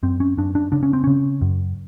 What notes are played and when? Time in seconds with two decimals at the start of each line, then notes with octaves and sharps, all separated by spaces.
0.03 F#2 C4
0.20 C#4
0.37 F#2 D4
0.55 D4
0.72 C#3 D4
0.83 C#4
0.93 C4
1.04 C#3 C#4
1.42 F#2